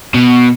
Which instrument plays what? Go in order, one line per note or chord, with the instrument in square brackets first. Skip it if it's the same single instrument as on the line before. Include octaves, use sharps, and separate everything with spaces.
[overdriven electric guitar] B2